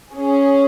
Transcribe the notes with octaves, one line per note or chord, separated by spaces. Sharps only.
C#4 G#4